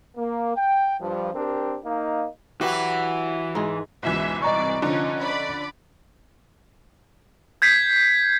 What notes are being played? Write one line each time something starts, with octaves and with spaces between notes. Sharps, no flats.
A#3
G5
G2 F3
C4 D4 G4 A#4
A#3 D#4 D#5 F5
E3 F#3 F#4 G4 B4
G#2 G#3 G#4
C#2 G#2 B2 E3 E5
C2 D5 D#5 A#5 C#6
D3 F3 C#4 D#4
D5 B5
G6 G#6 B6 C7